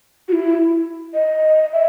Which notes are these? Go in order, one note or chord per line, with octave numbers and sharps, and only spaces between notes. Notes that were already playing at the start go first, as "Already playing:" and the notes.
F#4
E4
D#5
E5